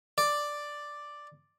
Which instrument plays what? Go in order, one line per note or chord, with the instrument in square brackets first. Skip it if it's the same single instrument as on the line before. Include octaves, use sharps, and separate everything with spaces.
[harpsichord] D5